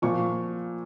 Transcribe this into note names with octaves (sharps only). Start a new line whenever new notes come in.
A#2 F3 C#6